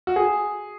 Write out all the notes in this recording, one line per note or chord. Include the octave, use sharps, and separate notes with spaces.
F#4
G#4